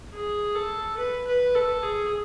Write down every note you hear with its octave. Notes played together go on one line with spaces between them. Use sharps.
G#4
A4
B4
B4
A4
G#4